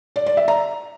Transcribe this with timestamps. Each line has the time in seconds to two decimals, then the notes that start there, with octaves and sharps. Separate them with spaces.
0.16 D5
0.26 D5
0.37 E5
0.48 A#5